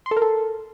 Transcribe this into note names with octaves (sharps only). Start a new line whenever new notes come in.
C6
A4
A#4
A4